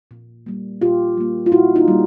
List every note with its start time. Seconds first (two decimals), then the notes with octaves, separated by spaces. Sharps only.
0.11 A#2
0.46 G3 A#3
0.81 A#2 F4 G4
1.17 G3 A#3
1.46 F4
1.52 A#2 E4 F#4
1.76 D#4 F4
1.88 G3 A#3